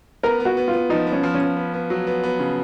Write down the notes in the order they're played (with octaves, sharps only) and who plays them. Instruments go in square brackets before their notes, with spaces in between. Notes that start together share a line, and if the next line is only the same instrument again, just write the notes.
[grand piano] B3 [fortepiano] A#4
[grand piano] B3
[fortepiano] F#4
[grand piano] B3
[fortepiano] F4
[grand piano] B3
[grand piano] F3 [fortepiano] D#4
[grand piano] B3
[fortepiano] C#4
[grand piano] F3
[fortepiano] C#4
[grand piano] F3
B3
B3
F#3
B3
B3
C#3